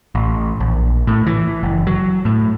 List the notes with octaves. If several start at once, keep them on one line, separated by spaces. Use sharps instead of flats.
A1
A#1
A2
E3
F#1
F#3
A2